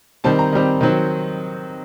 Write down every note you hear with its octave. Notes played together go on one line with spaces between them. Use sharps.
D#3 G3 C4 A5
A#5
D#3 G3 C4
D#3 F#3 C4